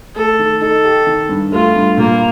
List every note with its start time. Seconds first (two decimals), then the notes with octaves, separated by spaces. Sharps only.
0.16 A3 A4
0.39 D#3
0.61 D#4 A4
0.84 G4
1.07 D#3
1.29 G2
1.52 A3 F4
1.75 G2
1.97 A#2 A#3